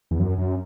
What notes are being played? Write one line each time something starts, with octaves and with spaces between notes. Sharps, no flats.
E2
F#2
F#2